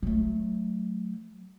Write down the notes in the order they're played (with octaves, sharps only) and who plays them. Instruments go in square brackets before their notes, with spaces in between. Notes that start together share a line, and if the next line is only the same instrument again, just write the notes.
[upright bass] F#3 A3